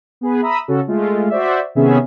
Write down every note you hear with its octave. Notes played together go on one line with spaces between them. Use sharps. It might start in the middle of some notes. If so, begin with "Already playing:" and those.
B3 G#4 B4
E5 A#5 B5 D#6 E6
C#3 C#4 F#4 A4
G#3 A3 F4
F#4 C5 D5 E5
C3 D#3 B3 C#4 G#4 E5